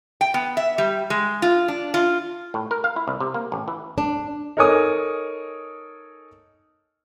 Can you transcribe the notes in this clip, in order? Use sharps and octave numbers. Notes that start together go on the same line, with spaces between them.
G5
B3
E5
G3
G#3
F4
D4
F4
A2
A#4
F5
E4
C2
C3
A#3
A1
E3
D4
D#4 A4 A#4 C#5 G#5 D#6